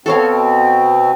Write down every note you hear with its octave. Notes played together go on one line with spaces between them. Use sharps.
B2 C4 A4 C#5 F5